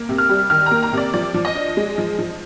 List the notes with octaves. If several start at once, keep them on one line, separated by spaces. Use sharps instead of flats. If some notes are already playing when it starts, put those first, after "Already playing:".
Already playing: A#3
C3
F6
G3
D#3 F6
A#5
A#3
A#5
C3 D5
F3 D5
F3
D#5
D4
G#3
F3
F3